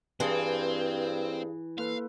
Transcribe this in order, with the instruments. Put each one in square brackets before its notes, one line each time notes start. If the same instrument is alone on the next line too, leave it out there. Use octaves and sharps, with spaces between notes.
[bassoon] G2 [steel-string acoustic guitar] E3 [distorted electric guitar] C4 [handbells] G#4 F5 A5
[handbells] A#3 A4 B4 [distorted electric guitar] F5